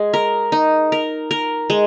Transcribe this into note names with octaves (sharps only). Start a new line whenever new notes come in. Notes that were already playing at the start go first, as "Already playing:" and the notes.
Already playing: G#3
A#4
D#4
A#4
A#4
G#3